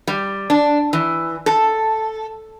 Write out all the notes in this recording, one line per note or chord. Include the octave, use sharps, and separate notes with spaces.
G3
D4
E3
A4